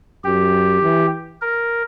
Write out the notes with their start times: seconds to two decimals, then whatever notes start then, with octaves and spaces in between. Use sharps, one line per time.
0.24 F#2 G4
0.82 E3
1.42 A#4